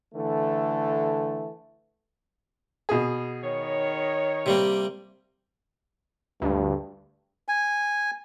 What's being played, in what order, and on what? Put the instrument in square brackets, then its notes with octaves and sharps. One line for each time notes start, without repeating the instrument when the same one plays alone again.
[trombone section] D3 E3 A3
[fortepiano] B2 G#4
[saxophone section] D#3 C#5
[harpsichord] C3 G3 A#3
[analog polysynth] D2 [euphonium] G2
[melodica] G#5